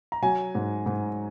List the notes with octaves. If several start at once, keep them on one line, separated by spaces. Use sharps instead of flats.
A#5
F#3 G#5
G#2
G#2